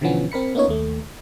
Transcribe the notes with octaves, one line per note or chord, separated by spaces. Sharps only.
B2 D3 E3 F3 B3 C#4
C4 A#4 B5 C#7
A#3 B3 C#4 D#4 F4 C#5
D#2 A3